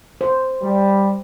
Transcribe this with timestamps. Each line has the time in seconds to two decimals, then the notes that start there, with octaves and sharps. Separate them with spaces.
0.21 C5
0.62 G3